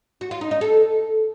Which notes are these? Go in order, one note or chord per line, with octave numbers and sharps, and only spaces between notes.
F#4
F4
D#4
D#4
A4